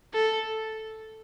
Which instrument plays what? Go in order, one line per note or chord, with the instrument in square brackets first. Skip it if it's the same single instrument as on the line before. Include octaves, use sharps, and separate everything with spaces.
[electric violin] A4